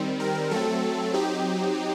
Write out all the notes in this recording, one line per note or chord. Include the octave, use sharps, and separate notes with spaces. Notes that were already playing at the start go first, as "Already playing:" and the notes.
Already playing: D#3 G3 C4
A#4
F#3 A3 C4 A4
F#3 C4 D#4 G4